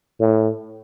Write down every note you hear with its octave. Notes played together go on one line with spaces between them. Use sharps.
A2